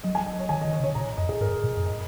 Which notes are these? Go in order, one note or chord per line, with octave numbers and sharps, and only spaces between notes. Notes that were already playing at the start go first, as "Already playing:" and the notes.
F#3 D#5
G#5
D#5
C#5
D#3 G#5
D#5
D#3
C#5
C#3
C#5
A#2 A#5
F#2 D#5
G#4
G#2 A#4
A#2
F#2
D#5